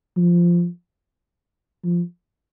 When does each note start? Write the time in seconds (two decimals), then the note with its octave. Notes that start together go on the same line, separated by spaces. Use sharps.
0.17 F3
1.84 F3